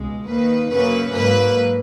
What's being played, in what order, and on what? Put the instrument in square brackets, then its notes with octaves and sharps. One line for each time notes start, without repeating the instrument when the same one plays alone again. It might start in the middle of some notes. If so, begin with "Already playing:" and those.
Already playing: [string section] C#2 B2 G#3
D#2 D#3 A#3 B4
F#2 C#3 F#3 A#3 B4
G#2 F#3 A#3 B4